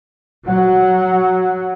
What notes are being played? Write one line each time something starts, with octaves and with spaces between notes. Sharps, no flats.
F#3 F#5